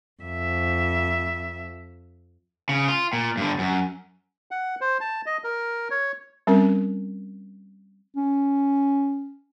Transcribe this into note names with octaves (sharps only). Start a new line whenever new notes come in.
F2 E5
C#3
F4
A#2
G2 D3
F#2
F#5
C5
A5
D#5
A#4
C#5
G3 C4 C#4 A#4
C#4